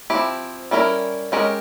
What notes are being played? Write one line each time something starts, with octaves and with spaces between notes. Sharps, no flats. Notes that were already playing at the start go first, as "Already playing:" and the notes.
F3 C4 E4 G4
G3 C#4 E4 A#4
G#3 C#4 G4 A#4 C#5